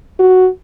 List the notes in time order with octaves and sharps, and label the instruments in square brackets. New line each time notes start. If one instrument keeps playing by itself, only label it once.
[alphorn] F#4